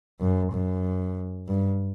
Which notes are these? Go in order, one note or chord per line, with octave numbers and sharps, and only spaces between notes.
F#2
F#2
G2